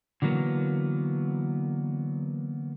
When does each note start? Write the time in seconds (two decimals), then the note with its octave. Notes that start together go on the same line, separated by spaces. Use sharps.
0.22 D3 E3 F#3 A#3 B3